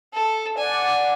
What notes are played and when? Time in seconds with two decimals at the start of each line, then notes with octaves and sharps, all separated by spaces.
0.14 A4
0.58 D5 F#5 G#5